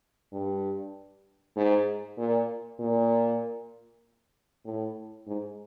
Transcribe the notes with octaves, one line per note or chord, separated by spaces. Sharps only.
G2
G#2
A#2
A#2
A2
G#2